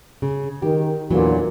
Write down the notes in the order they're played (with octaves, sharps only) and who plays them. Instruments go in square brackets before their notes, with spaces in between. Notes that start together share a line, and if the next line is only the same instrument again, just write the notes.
[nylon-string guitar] C#3
[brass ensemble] D#3 [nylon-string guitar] G4
[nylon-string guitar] E2 E3 F#3 [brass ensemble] A#2 D3